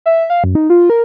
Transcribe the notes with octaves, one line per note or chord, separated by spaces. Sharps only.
E5
F5
F#2
D#4
F4
A#4